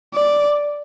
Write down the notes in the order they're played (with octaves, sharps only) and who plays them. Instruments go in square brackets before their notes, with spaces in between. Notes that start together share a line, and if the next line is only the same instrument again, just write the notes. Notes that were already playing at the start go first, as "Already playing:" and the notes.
[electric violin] D5